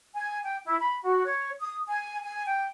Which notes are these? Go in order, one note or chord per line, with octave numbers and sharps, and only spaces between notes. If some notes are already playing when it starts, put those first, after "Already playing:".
G#5
G5
E4
B5
F#4
C#5
D#6
G#5
G#5
G5